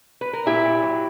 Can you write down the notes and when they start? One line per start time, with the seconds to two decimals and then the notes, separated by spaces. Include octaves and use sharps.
0.21 B4
0.33 A#4
0.46 A#2 E4 G4
0.64 A#2
0.83 F#3